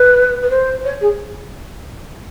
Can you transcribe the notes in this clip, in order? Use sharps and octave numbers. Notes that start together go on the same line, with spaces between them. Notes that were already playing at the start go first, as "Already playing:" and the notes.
Already playing: B4
B4
C5
C#5
G#4